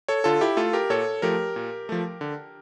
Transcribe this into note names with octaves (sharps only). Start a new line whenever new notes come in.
A4 C#5
D3 F4 A4
E4 G4
A3 F4 A4
G4 A#4
A#2 A4 C#5
F3 A3 G4 A#4
A#2
F3 A3
D3